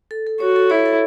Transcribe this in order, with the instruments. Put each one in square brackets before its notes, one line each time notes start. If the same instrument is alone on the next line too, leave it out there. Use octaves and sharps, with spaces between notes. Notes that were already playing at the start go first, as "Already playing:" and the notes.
[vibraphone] A4
A4
[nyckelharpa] F#4 [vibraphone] C#5
[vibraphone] A4
[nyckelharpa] E4 [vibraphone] C#5
[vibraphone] A4